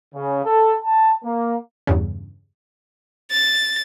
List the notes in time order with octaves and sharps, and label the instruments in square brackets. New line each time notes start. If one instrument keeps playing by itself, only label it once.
[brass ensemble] C#3
A4
A5
A#3
[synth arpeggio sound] E2 G2 C#3
[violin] A6